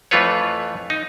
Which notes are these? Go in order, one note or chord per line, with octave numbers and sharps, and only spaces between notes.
F2 E3 A3 F4 B4 C#5
D#4